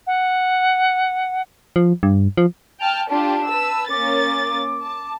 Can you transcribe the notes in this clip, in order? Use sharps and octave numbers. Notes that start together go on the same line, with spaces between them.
F#5
F3
G2
F3
G5 A5 F6 F7
D4 F4 G4 A5
B4 E6
A#3 C#4 D6 A6
A5